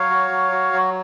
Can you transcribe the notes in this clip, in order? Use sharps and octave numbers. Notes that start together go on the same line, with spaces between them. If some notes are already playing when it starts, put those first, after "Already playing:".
Already playing: F#3 C#5 F5
F#4
F#3
F#4
F#3